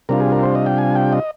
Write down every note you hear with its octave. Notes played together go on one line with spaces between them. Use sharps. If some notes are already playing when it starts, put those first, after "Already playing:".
C3 G3 D4 F4 A#4
G#4
A#4
C5
D#5
G5
G#5
G5
D#5